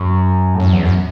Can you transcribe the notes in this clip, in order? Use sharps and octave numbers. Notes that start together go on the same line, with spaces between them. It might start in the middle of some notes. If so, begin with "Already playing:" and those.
Already playing: F#2
A2
F#2
E2
F#2